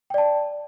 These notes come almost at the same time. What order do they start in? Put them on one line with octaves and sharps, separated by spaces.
G5 D5 A5